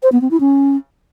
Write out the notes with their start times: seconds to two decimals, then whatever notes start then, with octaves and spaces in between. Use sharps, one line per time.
0.03 C5
0.12 B3
0.21 C4
0.31 E4
0.40 C#4